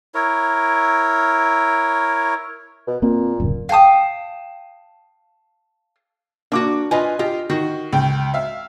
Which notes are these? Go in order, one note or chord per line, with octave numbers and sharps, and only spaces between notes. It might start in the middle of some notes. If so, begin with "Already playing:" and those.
E4 A#4 C#5
B2
A#2 A#3 C4
D1 F#2 C#3
F5 G5 A5 D#6
A#3 D4 F#4 D6
F4 B4 D#5 G#5
F4 G4 D#5
D#3 F#4
C#2 G5
E5 F5